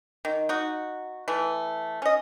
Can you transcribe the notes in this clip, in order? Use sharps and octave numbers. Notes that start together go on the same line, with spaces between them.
D#3
D#4 F#4
E3 A3
C#4 D#5